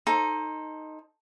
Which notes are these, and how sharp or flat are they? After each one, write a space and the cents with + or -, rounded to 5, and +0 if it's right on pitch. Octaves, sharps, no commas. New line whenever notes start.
D#4 +0 A4 +0 C5 +15